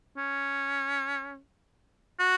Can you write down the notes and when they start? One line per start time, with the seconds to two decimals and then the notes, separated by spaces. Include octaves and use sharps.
0.17 C#4
2.19 F#4